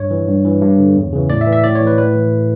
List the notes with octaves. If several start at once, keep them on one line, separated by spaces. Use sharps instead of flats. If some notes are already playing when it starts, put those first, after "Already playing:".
Already playing: G2 C#5
E3
G2
E3
G2
D3
E2
C#3 E3
A2 D5
E5
E3
E5
A2 D5
C#5
E3
B4
A2 B4
E3